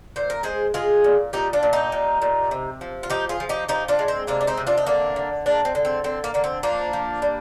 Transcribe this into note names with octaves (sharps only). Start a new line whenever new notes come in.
A#2 C5
A#4
G#3 G#4 C5
G#3 F4 G#4
A#2
A#2 D#4 G4
D4 F4
A#2
D#4 G4
A#2
A#2
C3
F3
F4
F3 D#4 G4
F4 G#4
F3
D#4 G4
F3 D#4 G4
D4 F4
G#3
C4
C3 A#3 D4
D4
C4 D#4
C3
D4 F4
D#4
D3 A#3 D4
D3
G#3 A#3 D4
C4
D3
C4
D3 C4
A#3
D3 A#3
C4
F3 A#3 D4
F3
G3